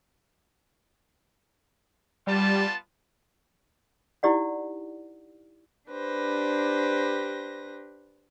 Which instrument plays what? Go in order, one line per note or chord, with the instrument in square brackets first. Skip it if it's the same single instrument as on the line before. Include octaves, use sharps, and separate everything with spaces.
[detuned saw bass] G3 [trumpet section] B3 F4 A5
[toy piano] D#4 E4 G4 D5 F#5
[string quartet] D4 G4 B4 C5 A#6